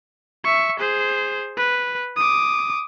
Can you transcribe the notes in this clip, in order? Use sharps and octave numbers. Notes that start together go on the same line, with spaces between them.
E5 C#6
G#4 C5
B4
D6 D#6